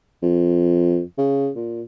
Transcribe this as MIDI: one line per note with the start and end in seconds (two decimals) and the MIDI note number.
0.23 1.01 41
1.18 1.50 49
1.55 1.82 46